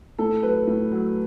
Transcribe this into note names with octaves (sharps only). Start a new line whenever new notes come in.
A2 A4
F#3 B4
A2
F#3